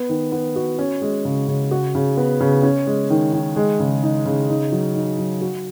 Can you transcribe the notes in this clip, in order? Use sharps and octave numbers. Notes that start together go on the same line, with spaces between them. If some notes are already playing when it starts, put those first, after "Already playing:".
Already playing: B3
D#3
B3
F#4
C#4
G#3
C#3
C#3
F#4
C#3
B3
C#3
C#4
G#3
D#3
D#3
G#3
C#3
D#4
C#3
D#4
F#3
D#4
F#3
F#4